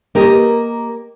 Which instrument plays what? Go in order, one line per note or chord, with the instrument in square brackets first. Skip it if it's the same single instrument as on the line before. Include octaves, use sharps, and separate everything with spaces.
[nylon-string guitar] A#3 G4 A#4 D#5